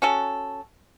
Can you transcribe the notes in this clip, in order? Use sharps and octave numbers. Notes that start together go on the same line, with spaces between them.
C#4 F#4 A4